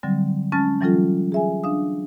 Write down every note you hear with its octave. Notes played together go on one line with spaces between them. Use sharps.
D3 F#3 G3 C4
G#3 C#4 A5 F6 A6
E3 F#3 G3 C#4 F4 A4
G#4 E5 G#5
D4 F5 D#6